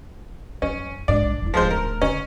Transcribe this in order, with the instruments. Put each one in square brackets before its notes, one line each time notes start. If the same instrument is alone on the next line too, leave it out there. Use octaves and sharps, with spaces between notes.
[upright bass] F#2 [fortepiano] C#4
[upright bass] B1 G#2 [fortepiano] D4 D5
[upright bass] D#1 E4
[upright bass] D1 A3 [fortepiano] F3 G#3 C5
[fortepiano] A#4
[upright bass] D3 [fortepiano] C#4